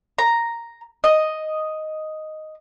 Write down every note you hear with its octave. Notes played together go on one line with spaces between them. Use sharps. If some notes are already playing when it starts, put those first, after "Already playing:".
A#5
D#5